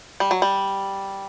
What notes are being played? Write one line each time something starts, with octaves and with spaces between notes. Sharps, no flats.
G3
F#3
G3